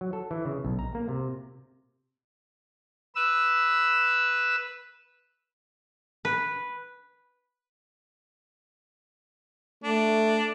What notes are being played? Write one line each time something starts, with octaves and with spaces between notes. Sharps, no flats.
F#3
A4
E3
C#3
B1
A#5
A#3
C3
B4 E6
B4
A3 D4